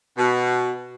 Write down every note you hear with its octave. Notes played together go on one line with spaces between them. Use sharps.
B2